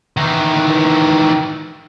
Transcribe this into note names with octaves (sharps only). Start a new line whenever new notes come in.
D#3 E3